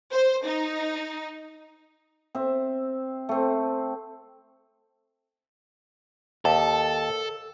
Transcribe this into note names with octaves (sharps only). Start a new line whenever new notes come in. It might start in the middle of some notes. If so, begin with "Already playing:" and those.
C5
D#4
C4 E5
A3 C4
D#2 A4